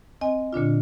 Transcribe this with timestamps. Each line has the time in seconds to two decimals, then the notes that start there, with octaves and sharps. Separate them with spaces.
0.21 C4 D#5 G#5
0.53 A#2 D3 D4 F4